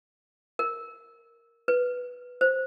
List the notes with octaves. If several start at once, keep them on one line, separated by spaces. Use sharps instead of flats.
A#4
B4
C5